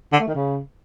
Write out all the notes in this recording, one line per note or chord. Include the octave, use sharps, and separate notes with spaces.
D3
A3
D#3
C#3